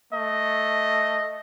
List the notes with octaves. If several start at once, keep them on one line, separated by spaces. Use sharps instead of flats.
A3 D#5